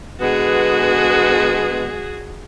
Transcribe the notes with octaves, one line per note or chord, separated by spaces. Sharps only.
D3 G#3 B3 F#4 G#4